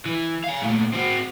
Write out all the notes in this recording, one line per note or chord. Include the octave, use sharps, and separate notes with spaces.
E3
F5 G#5
A#2 A3
C4 F#4